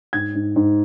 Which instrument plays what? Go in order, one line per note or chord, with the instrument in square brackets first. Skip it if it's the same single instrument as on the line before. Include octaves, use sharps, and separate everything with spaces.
[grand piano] G#2 G#6
G#2
G#2